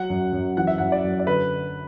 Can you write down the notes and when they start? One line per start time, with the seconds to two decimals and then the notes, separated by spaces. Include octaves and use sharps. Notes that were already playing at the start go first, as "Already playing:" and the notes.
Already playing: F#3 F#5
0.10 F#2
0.33 F#2
0.57 E3 F#5
0.67 E5
0.78 F#2 F#5
0.92 D5
1.04 F#2
1.19 D5
1.27 D3 B4